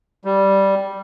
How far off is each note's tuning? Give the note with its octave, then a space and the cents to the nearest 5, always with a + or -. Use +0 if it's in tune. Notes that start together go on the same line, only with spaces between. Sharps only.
G3 -5